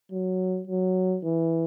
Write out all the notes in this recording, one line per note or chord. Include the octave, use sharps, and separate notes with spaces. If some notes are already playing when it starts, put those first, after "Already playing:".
F#3
F#3
E3